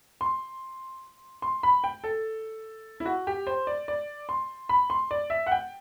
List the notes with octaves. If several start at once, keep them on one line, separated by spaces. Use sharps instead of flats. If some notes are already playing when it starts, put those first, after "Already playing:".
C6
C6
B5
G5
A4
E4
F#4
G4
C5
D5
D5
C6
B5
C6
D5
E5
F#5
G5